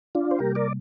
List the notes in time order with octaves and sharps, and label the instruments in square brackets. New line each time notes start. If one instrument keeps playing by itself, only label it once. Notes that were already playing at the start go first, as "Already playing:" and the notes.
[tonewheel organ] D4 F4
C5
[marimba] C3 G3 A#3 [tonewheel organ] G4 A#4
[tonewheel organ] A#4 D5